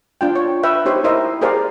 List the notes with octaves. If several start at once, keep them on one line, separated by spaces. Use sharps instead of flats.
D4 F4 G5
C#5
B4 E5 G5
D#4 G4 C5 C#5
E4 A#4 C5 D#5 E5
G4 G#4 A#4 C5 D5 F5